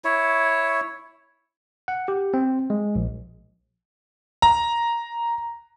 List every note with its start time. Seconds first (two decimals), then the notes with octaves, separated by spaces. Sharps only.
0.05 E4 C#5
1.88 F#5
2.08 G4
2.34 C4
2.70 G#3
2.95 A#1
4.42 A#5